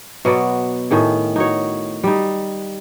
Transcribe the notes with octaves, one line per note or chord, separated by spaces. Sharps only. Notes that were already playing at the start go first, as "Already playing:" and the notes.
B2 F#3 B3 D5
A2 D#3 G#4
D#4 F#4 C#5
G3 D#4